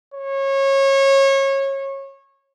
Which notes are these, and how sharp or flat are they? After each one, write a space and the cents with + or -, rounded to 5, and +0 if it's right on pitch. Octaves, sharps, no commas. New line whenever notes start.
C#5 -25